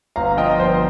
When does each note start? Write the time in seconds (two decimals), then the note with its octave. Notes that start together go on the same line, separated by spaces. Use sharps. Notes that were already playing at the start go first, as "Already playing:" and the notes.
0.16 G1 F5 A#5
0.37 F3 D#5 G5
0.60 G1 C5